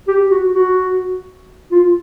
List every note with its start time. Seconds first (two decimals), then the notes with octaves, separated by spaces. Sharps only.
0.08 G4
0.31 F#4
0.55 F#4
1.72 F4